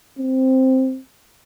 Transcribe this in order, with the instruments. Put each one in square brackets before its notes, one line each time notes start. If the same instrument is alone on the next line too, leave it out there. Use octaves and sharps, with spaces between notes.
[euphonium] C4